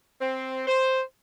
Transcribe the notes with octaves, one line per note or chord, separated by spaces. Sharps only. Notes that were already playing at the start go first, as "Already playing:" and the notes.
C4
C5